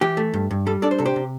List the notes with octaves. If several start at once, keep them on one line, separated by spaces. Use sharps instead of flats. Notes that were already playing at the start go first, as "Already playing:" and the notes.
E3 G4
A3
G2
G2
G3 A4
D4 A4 D5
C5
C3 A4
G4 C5
C3